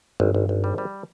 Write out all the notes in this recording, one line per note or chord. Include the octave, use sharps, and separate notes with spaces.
G#1 G2
G#1
G#1
G3
G3